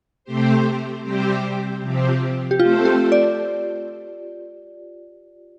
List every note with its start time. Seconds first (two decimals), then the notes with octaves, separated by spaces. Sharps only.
0.24 C3 A3 C4 G4 C5
1.03 C3 G3 C4 G4 C5
1.81 C3 F3 C4 G4
2.51 G4
2.60 A3 C4 F4 A4 C5
2.85 G4
3.12 D5